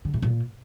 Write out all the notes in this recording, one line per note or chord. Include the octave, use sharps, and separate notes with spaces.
D3
A2
A#2